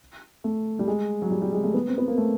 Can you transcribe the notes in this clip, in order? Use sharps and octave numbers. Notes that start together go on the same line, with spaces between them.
A3
G3
G#3
F#3
G3
G3
G#3
A3
B3
C4
B3
A#3
A3